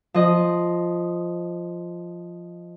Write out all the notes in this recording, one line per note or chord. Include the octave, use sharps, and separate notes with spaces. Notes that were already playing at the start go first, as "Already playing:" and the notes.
F3 D#5